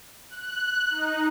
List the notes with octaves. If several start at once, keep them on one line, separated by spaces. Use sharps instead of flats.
F#6
D#4